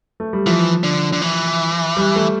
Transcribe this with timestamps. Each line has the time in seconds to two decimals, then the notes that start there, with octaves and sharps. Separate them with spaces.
0.20 A3
0.33 G3
0.46 E3 F3
0.84 D3
1.13 D3
1.22 E3
1.97 G3
2.16 A3